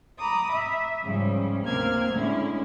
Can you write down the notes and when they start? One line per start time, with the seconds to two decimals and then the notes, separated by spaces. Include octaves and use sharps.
0.18 A#5 B5 D6 D#6
0.52 E5
1.03 G#2 C#3 F3 G3 C#4
1.66 D2 C3 A#3 C4 F6 G#6
2.12 A2 D3 G#3 C#4 E4